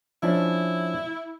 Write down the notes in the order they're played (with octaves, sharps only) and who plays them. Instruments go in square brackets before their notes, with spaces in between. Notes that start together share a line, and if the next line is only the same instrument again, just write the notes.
[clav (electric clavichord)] F3 C#4 D4 [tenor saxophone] E4